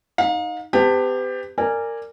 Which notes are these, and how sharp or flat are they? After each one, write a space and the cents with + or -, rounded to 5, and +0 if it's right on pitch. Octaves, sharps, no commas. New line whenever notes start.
D#4 +5 F5 +35
B3 +45 G4 +20 A5 +20
A#4 -20 D5 +0 G#5 -15